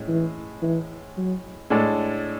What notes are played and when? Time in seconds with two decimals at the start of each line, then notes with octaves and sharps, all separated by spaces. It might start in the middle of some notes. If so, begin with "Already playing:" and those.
Already playing: A2 G#3 C#4
0.08 E3
0.62 E3
1.17 F#3
1.70 A2 G#3 A3 D4 A4 D5